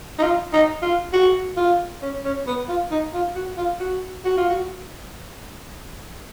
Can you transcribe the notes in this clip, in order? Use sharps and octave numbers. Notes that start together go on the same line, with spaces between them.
D#4
F4
D#4
F4
F#4
F4
C#4
C#4
B3
F4
D#4
F4
F#4
F4
F#4
F#4
F4
F#4